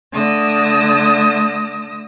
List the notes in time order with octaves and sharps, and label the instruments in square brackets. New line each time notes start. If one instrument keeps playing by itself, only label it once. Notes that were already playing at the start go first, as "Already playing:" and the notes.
[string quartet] D3 A3 D#6 E6 A#6